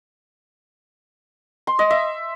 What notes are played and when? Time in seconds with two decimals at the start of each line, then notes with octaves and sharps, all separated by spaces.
1.67 C6
1.79 D#5
1.90 E5